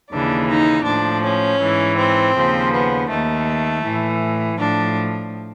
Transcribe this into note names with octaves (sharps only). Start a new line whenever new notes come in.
D#2 C#3 E3 D4
D#4
A2 F3 D4
C#4
G#2 E3
C4
D#2 C#3 F3
B3
D#2 D#3 A3
A2 E3
A2 F3 D4